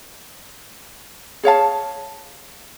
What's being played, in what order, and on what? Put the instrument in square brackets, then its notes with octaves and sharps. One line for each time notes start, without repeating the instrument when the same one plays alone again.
[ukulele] G#4 C#5 F5 A5